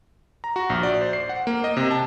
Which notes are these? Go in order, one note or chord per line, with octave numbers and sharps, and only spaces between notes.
A#5
F#4
A#1
D5
C5
C7
F#5
A#3
D#5
C3
A5